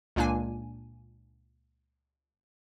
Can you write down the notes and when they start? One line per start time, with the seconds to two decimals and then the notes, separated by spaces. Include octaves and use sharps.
0.16 C#2 A#2 A#3 D4 G#5